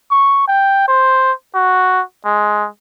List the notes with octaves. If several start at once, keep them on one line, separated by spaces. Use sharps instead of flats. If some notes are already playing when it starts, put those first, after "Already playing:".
C#6
G5
C5
F#4
G#3